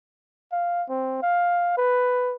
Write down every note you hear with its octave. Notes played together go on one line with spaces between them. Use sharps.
F5
C4
F5
B4